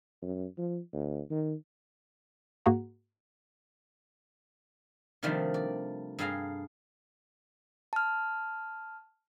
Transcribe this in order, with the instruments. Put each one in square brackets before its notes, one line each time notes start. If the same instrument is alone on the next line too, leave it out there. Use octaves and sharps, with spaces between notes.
[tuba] F#2
F3
D2
D#3
[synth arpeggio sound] G#2 A#3 F#4 G#4 F#5 A#5
[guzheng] C3 D#3 F3 G3 A3 D4
D5
G2 G#4 A4 F5 G#5 A#5
[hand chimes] A5 F6